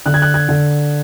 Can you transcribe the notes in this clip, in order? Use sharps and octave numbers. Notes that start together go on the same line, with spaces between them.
D3 F#6
G#6
F#6
G#6
D3